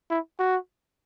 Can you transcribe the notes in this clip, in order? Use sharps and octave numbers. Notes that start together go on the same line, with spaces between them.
E4
F#4